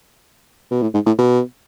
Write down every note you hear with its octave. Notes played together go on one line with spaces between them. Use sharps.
B2
A2
G#2
A2
B2